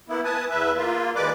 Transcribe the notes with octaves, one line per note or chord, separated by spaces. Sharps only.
A#3 B3 E4
B4 G#5 A5 D#6
E2 B4 E5
A#3 F4
D#2 G#3 A#3 B4 D5 D6